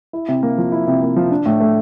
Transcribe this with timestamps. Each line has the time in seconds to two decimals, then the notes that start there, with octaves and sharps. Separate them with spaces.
0.13 E4
0.28 C3
0.43 A#3
0.58 F3
0.72 E4
0.87 C3
1.02 A#3
1.16 F3
1.31 D4
1.46 A2
1.60 A3